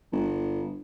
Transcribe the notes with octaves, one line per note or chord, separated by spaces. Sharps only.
G1